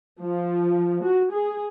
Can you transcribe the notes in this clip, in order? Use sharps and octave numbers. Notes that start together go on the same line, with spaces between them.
F3
F#4
G#4